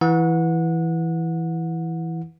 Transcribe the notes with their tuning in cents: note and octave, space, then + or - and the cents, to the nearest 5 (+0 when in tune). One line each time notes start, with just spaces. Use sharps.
E3 +0 F#5 -25